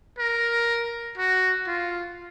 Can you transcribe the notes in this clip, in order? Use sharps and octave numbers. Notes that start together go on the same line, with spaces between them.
A#4
F#4
F4